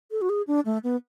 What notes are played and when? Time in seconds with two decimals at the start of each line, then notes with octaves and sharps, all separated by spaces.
0.11 A4
0.22 F#4
0.29 G#4
0.47 D4
0.66 A3
0.83 B3